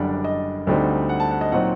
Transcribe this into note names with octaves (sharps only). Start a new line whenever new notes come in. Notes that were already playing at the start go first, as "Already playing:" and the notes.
Already playing: F#1 F#2 D3 G3 D4 F#5
D#5
D2 D3 G3 C4 D#4
F#5
A5
F#5
D#5
A#2 F#3 C4 D#4 F#5